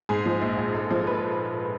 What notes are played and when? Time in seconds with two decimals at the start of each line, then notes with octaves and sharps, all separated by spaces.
0.09 G#2 G#4
0.26 F3
0.42 A#1
0.58 A#1
0.74 G#2 A4
0.90 F3 A4
1.07 B4